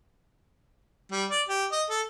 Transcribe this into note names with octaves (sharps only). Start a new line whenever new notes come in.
G3
D5
G4
D#5
A4